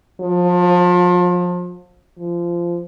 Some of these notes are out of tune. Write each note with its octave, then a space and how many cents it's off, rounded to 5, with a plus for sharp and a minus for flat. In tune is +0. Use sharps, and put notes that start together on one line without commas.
F3 +30
F3 -20